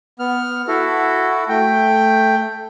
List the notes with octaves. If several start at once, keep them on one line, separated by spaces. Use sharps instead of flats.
B3 F6
E4 F#4 A4
A3 G5